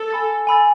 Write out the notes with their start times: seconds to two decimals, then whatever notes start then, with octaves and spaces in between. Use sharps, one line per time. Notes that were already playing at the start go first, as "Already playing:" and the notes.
Already playing: A4
0.11 G#5 B5 E6 A6
0.47 G#5 B5 E6 A6